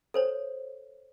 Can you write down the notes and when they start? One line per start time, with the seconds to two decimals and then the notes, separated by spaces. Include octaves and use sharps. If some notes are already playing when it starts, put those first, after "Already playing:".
0.14 A4 C5 C#5